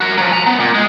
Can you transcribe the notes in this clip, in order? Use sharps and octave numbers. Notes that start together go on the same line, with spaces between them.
F#4 A#4
F3 F#3
G#5 A#5
B3
A#2
G#3